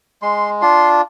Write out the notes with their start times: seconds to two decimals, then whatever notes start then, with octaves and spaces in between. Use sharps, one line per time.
0.22 G#3 C6
0.62 D4 F4 C6